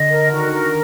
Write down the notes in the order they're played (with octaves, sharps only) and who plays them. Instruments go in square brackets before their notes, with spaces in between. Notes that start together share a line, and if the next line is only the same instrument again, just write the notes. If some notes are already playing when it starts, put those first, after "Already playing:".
Already playing: [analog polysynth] D3 [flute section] D#5
[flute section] A#4
[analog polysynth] D3
[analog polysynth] D#3 [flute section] F#4
[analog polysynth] D#3
[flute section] A#4